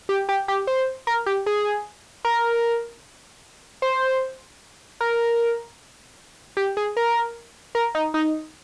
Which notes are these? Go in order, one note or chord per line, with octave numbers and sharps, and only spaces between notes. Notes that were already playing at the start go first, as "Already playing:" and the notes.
G4
G4
G4
C5
A#4
G4
G#4
A#4
C5
A#4
G4
G#4
A#4
A#4
D#4
D#4